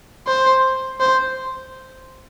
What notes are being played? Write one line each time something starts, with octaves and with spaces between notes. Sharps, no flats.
C5
C5